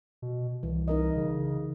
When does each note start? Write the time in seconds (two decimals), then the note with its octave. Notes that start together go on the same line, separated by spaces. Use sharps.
0.22 B2
0.63 C2 E3
0.88 D#4 A#4 D#5
1.16 C#3